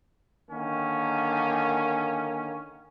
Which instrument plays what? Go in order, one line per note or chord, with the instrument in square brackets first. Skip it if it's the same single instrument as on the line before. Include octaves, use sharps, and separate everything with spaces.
[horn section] D3 D#3 A#3 C#4